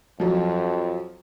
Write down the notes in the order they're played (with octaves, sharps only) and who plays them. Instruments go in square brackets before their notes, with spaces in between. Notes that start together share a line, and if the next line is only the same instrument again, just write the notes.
[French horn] F2 [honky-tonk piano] F3 F#3